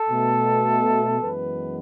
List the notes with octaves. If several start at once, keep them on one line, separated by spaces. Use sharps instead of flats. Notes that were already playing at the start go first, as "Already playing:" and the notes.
Already playing: A4
B2 A3
F#2 E3 G#3 B3 B4